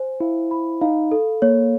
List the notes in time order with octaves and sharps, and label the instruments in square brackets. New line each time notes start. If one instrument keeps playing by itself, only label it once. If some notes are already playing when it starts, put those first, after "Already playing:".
Already playing: [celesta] C5 G#5
[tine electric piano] E4 [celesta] F5
[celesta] B5
[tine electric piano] D#4 [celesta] F5
[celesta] A4
[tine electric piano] A#3 [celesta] C#5